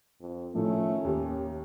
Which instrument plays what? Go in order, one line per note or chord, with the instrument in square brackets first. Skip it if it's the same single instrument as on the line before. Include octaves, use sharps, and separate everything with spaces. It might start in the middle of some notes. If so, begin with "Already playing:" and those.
[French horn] F2
[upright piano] A2 F3 [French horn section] D#3 C#4 [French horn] A3
[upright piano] D#2 [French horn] G4